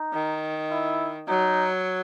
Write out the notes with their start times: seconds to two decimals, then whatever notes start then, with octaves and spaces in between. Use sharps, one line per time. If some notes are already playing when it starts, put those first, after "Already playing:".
Already playing: D#4
0.14 D#3
0.71 E4
1.28 F#3 D#4